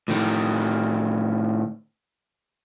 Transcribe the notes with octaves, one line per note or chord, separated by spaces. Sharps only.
A2 D#3